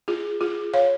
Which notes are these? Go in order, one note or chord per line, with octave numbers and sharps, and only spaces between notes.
F4 G#4
F4 G#4
C#5 F5